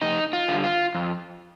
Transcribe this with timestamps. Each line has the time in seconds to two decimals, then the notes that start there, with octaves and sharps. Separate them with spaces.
0.02 F2 D#4
0.33 F4
0.48 D3 G3
0.64 F4
0.95 F2